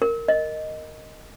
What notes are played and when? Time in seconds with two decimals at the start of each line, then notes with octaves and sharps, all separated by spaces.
0.02 A#4
0.28 D#5